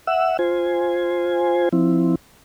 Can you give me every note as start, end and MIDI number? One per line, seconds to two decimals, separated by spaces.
0.07 0.37 76
0.07 0.37 78
0.07 0.37 88
0.39 1.69 65
0.39 1.69 72
0.39 1.69 80
1.73 2.15 53
1.73 2.15 60
1.73 2.15 64